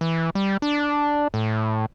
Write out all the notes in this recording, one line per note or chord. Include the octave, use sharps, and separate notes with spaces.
E3
G3
D4
A2